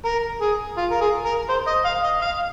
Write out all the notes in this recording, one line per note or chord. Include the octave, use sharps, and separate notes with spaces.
A#4
G#4
F4
A#4
G#4
A#4
C5
D#5
F5
D#5
F5